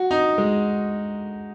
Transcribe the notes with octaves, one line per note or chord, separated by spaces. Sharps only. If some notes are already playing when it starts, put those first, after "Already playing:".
Already playing: F#4
D#4
G#3